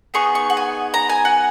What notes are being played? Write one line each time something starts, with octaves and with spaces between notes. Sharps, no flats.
B3 D#4 G#4 C#6
C#6
F#5
G#5
A#5
G#5
F#5